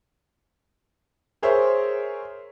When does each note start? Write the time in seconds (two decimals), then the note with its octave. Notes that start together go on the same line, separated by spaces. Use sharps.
1.42 G#4 A#4 C5 C#5 E5